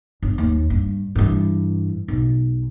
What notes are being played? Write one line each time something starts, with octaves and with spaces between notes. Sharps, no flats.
G1
D#2
G2
G2 E3
B1